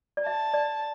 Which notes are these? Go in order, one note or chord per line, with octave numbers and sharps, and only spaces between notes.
D5
E5 A5
D5